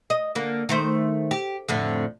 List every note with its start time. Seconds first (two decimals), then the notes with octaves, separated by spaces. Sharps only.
0.10 D#5
0.35 D3 A#3
0.69 D#3 A3 C5
1.31 G4
1.68 F2 A2 D3